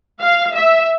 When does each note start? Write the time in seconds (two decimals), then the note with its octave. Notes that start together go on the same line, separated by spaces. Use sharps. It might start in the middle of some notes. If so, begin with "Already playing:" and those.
0.20 F5
0.54 E5